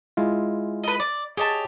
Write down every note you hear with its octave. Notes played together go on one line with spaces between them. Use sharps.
G#3 E4 F4
B4 D#5
D5
G4 G#4 C#5 D#5 A5